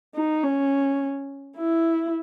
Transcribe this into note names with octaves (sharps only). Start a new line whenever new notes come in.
D#4
C#4
E4